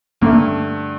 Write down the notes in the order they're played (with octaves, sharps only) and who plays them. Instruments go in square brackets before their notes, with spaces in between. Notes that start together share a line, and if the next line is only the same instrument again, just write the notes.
[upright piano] G2 D3 A3 [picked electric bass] A#3